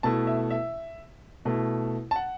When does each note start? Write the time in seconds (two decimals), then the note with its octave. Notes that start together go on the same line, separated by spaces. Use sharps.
0.03 B2 A3 E4 A5
0.27 E5
0.51 E5
1.45 B2 A3 E4
2.11 A5
2.16 F#5